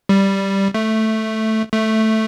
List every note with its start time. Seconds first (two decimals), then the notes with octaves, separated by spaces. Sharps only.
0.09 G3
0.74 A3
1.72 A3